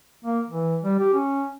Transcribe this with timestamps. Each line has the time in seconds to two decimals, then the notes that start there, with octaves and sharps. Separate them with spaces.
0.25 A#3
0.50 E3
0.84 G3
0.99 G4
1.14 C#4